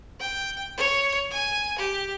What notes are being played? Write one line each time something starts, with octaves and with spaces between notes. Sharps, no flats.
G5
C#5
G#5
G4